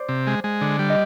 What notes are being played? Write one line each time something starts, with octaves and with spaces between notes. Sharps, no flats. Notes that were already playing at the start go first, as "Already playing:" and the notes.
Already playing: C5 D5
C3
G#3
G#3
D3
G3
D#5